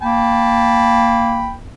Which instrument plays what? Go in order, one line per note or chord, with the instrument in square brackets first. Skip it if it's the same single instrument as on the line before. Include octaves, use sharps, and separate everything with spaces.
[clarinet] A#3 [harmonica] G5 A5 B5